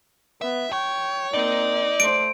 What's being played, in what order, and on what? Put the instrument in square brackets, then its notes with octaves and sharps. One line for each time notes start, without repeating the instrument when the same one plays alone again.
[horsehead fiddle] B3 [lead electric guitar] E5
[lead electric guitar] C#5 [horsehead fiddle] G5
[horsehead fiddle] A#3 C4 [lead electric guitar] D#4 [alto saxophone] D5
[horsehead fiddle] A3 C5 [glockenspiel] D7